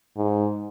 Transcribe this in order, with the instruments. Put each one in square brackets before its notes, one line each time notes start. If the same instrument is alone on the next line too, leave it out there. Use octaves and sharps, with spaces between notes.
[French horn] G#2